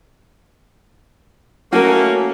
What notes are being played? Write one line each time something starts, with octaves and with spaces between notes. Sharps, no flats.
A3 A#3 C#4 F#4 A#4